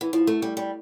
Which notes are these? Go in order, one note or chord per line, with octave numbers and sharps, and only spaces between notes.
E3
F3
A3
G3
G3